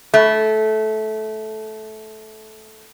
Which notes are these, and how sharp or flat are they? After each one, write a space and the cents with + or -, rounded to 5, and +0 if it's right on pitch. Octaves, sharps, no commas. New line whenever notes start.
A3 -15